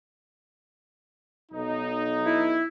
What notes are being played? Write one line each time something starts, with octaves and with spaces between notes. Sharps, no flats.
B1 D#4
E4